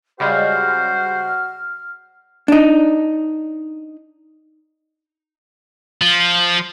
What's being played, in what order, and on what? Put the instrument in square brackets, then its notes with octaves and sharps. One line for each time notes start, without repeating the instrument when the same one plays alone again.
[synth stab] C#3 G3 G#3 [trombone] F#4 [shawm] C5 [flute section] F6
[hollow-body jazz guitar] D4 D#4
[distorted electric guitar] F3 F4